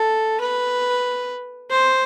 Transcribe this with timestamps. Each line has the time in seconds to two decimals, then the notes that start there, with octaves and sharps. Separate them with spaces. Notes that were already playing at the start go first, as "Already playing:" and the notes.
Already playing: A4
0.41 B4
1.70 C5